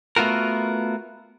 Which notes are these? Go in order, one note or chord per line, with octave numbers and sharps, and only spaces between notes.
A3 B3 F4 F#4 A#4